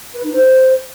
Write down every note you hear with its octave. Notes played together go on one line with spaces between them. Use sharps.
B4
D#4
C5